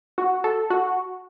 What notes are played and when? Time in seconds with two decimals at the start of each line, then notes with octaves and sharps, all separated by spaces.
0.18 F#4
0.44 A4
0.70 F#4